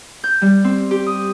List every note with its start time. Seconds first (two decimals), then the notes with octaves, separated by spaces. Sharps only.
0.24 G6
0.42 G3
0.64 C4
0.91 G4
1.06 D#6